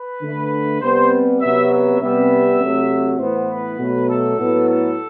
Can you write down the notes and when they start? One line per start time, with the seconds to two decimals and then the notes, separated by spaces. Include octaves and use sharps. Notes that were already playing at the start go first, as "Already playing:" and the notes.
Already playing: B4
0.22 D3 A3
0.81 C3 G3 B3 C5
1.41 C3 F#3 B3 E5
1.71 E5
2.00 C3 G3 B3 E5
2.60 C3 F#3 A3
3.20 A2 E3 B3 C5
3.50 B4
3.79 B2 F#3 A3
4.09 A4
4.39 A2 F#3 B3
4.69 A4